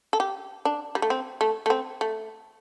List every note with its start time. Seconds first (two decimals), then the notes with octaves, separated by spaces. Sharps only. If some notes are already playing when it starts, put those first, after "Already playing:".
0.13 A4
0.20 G4
0.65 D4
0.95 G3
1.02 A3
1.10 C4
1.41 A3
1.66 A3
1.70 C4
2.01 A3